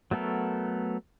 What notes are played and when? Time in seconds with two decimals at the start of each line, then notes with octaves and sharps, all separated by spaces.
0.11 F#3 A3 B3 A4 A#4